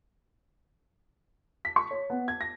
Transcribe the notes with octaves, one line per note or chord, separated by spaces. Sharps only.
B6
C#6
C#5
B3
G#6
A#6